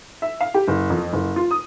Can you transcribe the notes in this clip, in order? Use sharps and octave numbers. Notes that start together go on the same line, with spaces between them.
E5
F5
G4
F#1
F2
F#1
F4
D#6